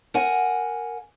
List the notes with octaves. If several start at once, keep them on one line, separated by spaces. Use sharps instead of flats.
A#4 F#5 G#5